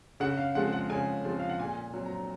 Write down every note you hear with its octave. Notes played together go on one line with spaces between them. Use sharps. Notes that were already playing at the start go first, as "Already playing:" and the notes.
C#3 F#5
F5
F3 G#3 C4 F#5
F#5
C#3 G#5
F3 G#3 C4
F5
F#5
A#2 G#5
F#3 C4
A#5